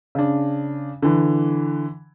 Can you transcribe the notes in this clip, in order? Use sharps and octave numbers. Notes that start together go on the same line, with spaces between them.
C#3 D4
D3 E3